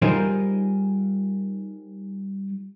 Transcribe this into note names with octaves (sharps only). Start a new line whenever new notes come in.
G3 D#4 F4 G#4 A#4 C5